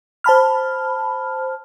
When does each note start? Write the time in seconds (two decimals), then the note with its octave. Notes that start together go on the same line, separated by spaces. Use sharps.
0.24 C5 A5 B5 F6